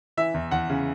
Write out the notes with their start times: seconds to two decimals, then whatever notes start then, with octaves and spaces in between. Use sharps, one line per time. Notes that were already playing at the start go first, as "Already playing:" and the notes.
0.17 E3 E5
0.34 E2
0.51 E2 F#5
0.70 C#3